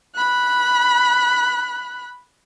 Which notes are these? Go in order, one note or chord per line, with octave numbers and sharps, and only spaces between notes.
B5 F#6